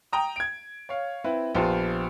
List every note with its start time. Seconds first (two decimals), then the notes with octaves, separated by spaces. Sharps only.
0.13 G5 A#5 D#6
0.36 G#6 D7
0.89 C#5 F5
1.24 C4 E4 B4
1.55 A#1 B3 F4 G4 C5 A5